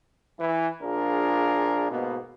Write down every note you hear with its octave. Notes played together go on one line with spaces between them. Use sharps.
E3
A#1 D4 F4 G#4 A#4
G#2 B2 A#3 B3